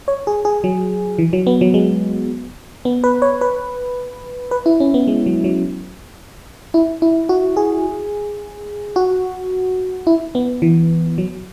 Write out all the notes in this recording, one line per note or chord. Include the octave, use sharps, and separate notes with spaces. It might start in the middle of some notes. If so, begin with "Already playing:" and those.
C#5
G#4
G#4
F#3
E3
F#3
B3
F#3
G#3
B3
B4
C#5
B4
B4
E4
C#4
B3
G#3
F#3
F#3
E4
E4
F#4
G#4
F#4
E4
B3
E3
F#3